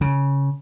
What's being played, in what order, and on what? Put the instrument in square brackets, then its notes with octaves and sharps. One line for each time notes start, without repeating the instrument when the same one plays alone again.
[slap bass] C#3